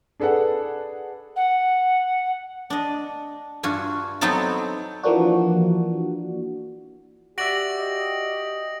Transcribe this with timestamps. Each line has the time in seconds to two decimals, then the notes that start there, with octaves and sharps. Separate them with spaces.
0.20 D4 G#4 A4 B4 F#5
1.36 F#5
2.70 D4 D#5
3.63 G2 F4 F#4 G#5
4.21 F#3 B3 C4 D#4 A4 A5
5.03 E3 F3 A#3 D4 F#4
7.38 F#4 G4 D5 E5 A#6 D7 F#7
7.80 D#5